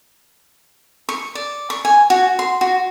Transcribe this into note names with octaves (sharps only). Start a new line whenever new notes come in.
C#6
D5
C#6
G#5
F#4
C6
F#4